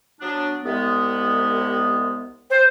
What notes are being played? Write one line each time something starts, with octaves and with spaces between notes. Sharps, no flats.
F#3 B3 D4
C2 G#3 B3
C5